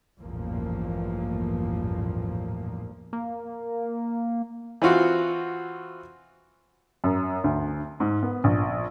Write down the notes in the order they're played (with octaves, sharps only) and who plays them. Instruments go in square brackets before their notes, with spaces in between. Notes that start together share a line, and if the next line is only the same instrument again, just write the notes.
[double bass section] A1 E2 G2 A#2 F3 A#3
[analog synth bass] A#3
[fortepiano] E3 C4 F4 F#4
[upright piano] F#2
D2
G#2
B3
A#1